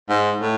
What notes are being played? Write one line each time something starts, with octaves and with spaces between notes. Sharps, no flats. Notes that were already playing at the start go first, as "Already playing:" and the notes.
G#2
A2